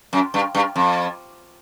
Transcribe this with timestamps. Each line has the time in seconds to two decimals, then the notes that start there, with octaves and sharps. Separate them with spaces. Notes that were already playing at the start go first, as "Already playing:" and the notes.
0.13 F#2
0.34 G2
0.55 G2
0.76 F2